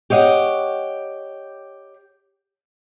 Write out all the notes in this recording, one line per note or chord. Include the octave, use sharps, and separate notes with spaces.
G4 C#5 D#5 F5 F#5